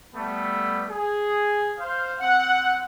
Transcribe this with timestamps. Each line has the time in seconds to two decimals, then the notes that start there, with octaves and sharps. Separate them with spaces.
0.15 G3 A3 B3 A4
0.89 G#4
1.79 C5 F5
2.20 C4 F#5